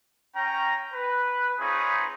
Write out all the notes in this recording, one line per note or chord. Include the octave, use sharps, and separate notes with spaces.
C#4 G5 A#5
B4
C4 D#4 F4 G#4 B4 C#5